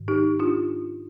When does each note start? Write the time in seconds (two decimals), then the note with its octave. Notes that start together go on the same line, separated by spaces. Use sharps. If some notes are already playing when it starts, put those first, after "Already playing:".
Already playing: G#2 D#3
0.08 D#4 G4
0.39 D4 F4